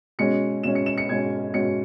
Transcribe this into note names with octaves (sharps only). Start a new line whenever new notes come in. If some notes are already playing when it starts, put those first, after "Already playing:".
B2 G#3 C#4 C#7
B2 G#3 C#4 E7
C#7
E7
C#7
B2 G#3 C#4 G#6
B2 G#3 C#4 C#7